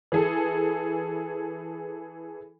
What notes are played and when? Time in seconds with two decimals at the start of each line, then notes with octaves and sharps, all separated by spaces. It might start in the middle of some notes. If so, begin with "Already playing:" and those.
0.12 E3 G#4 A4